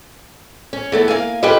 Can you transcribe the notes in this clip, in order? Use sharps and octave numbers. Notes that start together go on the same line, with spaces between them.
C#4
E3 A3 B3
A#3 F5 G#5
C#4 F4 G4 A4 B4 D#5